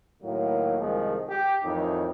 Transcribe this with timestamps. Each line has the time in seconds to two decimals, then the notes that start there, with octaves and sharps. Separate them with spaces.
0.23 A2 D#3 F#3 A#3
0.79 C2 D#3 F3 G#3
1.29 G4
1.64 F2 A2 D#3 E3 D#4